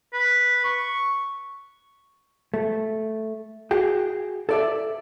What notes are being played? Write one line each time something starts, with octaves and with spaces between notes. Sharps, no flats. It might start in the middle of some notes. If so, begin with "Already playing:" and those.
B4
C#6
A3
F#4 G#4 G5
A4 D5 E5